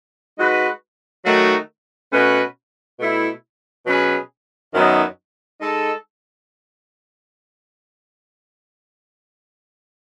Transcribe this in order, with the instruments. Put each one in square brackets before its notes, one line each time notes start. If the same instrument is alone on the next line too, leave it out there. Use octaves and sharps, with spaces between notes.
[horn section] G#3 D#4 F#4 B4
D#3 F#3 A3 D#4 F#4
B2 A3 C#4 F#4 B4
B2 A3 E4
B2 F#3 C#4 G#4 B4
F#2 D#3 F#3 B3 D#4
G#3 D#4 A4